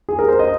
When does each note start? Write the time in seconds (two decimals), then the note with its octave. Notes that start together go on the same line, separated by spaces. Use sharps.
0.09 G#4
0.19 A#4
0.28 C5
0.39 D#5